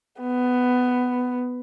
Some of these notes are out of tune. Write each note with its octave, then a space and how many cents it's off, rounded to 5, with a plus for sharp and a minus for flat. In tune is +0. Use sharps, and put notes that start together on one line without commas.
B3 +10